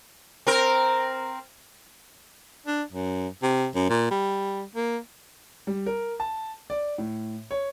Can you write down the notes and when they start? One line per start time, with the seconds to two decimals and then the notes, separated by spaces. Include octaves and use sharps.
0.47 C4 A#4
2.67 D4
2.92 F#2
3.43 C3
3.75 F#2
3.89 A#2
4.11 G3
4.76 A#3
5.67 G3
5.86 A#4
6.20 A5
6.70 D5
6.98 A2
7.51 C#5